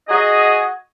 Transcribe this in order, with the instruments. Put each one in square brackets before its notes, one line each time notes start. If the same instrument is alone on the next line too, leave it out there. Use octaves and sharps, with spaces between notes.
[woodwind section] F#4 G#4 D#5